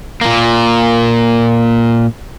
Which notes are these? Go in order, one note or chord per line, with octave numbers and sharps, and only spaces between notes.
A#2 A#3